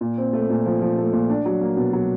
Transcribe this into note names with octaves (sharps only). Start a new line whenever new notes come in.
A#2
C4
A3
A#2
F3
F3
A3
A#2
D4
F#3
A#3
B2
F#3